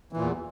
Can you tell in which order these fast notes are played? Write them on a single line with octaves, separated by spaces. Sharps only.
E3 A#2 E2